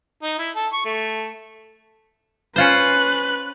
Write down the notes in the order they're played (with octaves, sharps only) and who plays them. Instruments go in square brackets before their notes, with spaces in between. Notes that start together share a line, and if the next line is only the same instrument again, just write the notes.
[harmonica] D#4
E4
A4
C#6
A3
[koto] C#4 F4 C5 [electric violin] B4 F#6